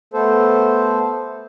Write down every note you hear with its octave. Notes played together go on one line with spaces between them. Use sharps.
A3 B3 A4 C5